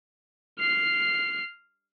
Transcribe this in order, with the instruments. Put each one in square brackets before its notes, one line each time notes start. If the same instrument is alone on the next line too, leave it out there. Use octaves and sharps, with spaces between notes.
[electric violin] F6 C7